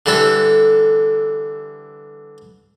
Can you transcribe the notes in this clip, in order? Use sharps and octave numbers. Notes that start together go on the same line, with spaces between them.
D3 E3 G3 A4